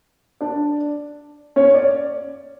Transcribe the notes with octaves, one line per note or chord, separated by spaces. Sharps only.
D4 D5
C#4 C#5
D5